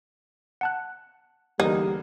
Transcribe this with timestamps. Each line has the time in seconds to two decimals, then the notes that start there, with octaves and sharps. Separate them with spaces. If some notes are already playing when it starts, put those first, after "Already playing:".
0.61 F#5 A5 F#6
1.60 E2 D3 G3 A#3 D#4